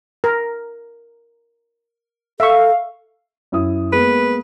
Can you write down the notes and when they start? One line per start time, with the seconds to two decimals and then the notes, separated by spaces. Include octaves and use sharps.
0.24 A#4
2.40 A4 E5 F5 C#6
3.52 F#2 E4 D#6
3.93 G#3 A#3 B3 B4